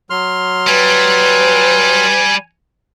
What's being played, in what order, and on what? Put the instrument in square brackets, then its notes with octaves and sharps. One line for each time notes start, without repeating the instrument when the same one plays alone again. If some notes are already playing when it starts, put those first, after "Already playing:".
[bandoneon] F#3 C6 F6
[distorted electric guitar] G3 [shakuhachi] B4 [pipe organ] G#5